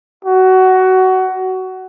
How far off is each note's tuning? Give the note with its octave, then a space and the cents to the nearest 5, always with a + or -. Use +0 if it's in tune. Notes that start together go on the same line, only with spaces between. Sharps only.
F#4 +20